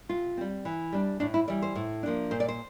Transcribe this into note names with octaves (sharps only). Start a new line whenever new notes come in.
C3 F4
G3 C4
E3
G3 D4
A2 D4
E4
E3 G3 D5
C5
A2
F3 A#3 D4
A#2 C5
D5
C5